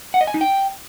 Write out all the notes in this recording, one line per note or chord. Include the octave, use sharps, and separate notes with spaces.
F#5
D#5
G#5
D#4
G5